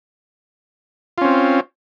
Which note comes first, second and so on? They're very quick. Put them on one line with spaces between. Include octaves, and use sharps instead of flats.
F4 C#4 C4